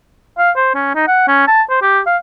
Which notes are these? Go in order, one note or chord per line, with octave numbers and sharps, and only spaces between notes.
F5
C5
C#4
D#4
F#5
C#4
A5
C5
G4
F5